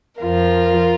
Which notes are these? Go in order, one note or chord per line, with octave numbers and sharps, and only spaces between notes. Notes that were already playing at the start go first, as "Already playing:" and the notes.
F2 F3 F4 A#4